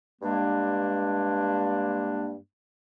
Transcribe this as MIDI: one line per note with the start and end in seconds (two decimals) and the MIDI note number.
0.22 2.36 43
0.22 2.36 56
0.22 2.36 58
0.22 2.36 62